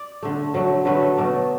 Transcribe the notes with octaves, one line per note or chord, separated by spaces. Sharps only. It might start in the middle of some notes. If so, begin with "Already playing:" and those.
Already playing: D5
D3 A3
D3 F#3 A3
D3 F#3 A3 B4
A4
B2 F#3 A3 D5